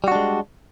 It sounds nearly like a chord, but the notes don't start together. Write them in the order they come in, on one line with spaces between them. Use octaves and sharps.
G3 F#4 D4 G#3